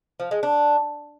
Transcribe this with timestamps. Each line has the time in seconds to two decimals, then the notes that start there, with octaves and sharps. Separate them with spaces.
0.20 F3
0.31 G#3
0.43 D4